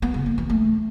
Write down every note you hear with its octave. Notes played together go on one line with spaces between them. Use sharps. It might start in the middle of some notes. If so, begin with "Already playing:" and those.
B3
C#3
A#3
E3
A3